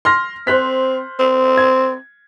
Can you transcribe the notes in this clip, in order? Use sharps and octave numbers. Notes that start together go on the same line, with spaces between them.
C6 F6 A#6
C4 C5 F#6 B6
C4
G#6